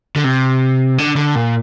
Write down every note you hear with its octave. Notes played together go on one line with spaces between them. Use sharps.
D3
C3
D3
D3
A#2